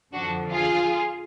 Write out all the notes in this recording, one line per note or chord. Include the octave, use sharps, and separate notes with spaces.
F2 D3 F3 D4 F#4
F4 G#4